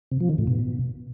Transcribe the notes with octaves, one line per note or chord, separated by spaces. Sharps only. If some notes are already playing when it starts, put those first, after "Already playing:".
C3
F3
D#3
A2
B2